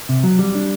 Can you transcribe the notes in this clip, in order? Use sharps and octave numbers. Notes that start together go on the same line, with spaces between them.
C3
F#3
G3
D4